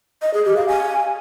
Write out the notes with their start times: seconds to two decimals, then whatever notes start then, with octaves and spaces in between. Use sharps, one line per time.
0.22 D#5
0.34 G#4
0.45 G4
0.57 F5
0.68 G#5